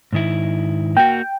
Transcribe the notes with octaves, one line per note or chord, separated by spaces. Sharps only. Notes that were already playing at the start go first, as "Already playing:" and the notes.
G#2 D#3 E4
A#3 F#4 G5